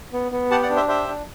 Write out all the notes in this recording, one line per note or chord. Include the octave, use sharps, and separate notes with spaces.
B3
B3
G4 F#5 A5
D5 F#5
D4
C5 E5
G4 C5 E5
D4